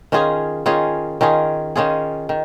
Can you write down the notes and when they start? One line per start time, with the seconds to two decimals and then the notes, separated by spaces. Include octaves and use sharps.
0.12 D#3 C#4 F4 G#4
0.66 D#3 C#4 F4 G#4
1.21 D#3 C#4 F4 G#4
1.76 D#3 C#4 F4 G#4
2.29 D#3